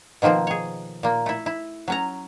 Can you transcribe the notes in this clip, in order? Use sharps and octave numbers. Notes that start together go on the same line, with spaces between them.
B2 D#3 F3 A#3 C4
G#4 C#5
A#2 A#3
A3 E4
E4
F#3 C#4 A#5